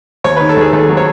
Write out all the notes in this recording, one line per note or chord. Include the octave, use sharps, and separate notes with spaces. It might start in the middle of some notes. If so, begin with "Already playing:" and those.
D#2 C#5
D#3 B4
A4
D#2 G#4
D#2 A4
F#3
C#5